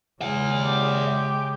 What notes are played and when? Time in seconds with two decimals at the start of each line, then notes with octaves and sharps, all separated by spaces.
0.21 C#3 G#3 E5 F#5
0.63 G4